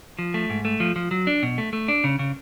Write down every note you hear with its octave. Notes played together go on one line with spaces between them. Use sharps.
F3
A3
G#2
A3
F3
F3
F#3
D4
B2
A3
A3
D4
C#3
C#3